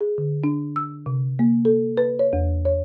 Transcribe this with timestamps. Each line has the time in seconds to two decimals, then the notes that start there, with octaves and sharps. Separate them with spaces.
0.01 G#4
0.18 D3
0.44 D4
0.76 E6
1.06 C3
1.39 A#3
1.65 A4
1.97 B4
2.19 C#5
2.33 E2
2.65 C#5